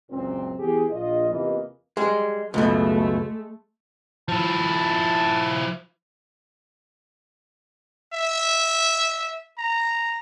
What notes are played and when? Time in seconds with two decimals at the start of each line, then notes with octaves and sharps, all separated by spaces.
0.11 C#2 F#2 A#2 C4
0.59 E3 B3 G4 G#4
0.90 A#1 F4 D#5
1.30 E2 C3 E3 A#3 F4 D#5
1.97 G3 G#3
2.54 C#2 F#2 B2 G#3 A3
4.28 F3 E4 A5
8.13 E5
9.58 A#5